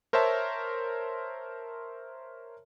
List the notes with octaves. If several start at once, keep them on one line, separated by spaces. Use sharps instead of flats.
A#4 C5 C#5 E5 A5